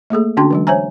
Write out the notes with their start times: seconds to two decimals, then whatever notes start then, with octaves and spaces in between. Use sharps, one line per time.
0.10 A3 A#3 G#4 A4
0.37 D3 C#4 D4 F#4 G5 C6
0.51 E3 F#3 G#3
0.67 C5 C#5 E5 G#5 A#5